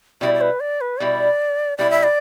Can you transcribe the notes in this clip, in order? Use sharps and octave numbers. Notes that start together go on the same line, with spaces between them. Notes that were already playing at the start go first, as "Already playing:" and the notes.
B2 G3 E4 D5
D5
B4
D5
B4
B2 G3 E4 D5
B2 G3 E4 D5
E5
D5